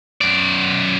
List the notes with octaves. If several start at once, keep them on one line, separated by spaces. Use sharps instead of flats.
F#2 D5